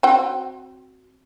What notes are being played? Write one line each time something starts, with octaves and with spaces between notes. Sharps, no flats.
C4 F#4 G5